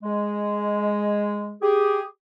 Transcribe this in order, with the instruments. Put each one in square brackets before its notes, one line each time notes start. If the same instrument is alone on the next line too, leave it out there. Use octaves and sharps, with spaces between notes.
[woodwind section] G#3
G4 G#4